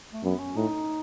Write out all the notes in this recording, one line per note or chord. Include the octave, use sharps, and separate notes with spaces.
A3
F#2 B3
C#4
A2 D#4